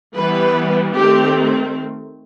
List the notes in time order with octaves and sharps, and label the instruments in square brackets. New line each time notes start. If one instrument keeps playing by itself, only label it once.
[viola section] E3 G3 B3 B4
D#3 A3 C4 G4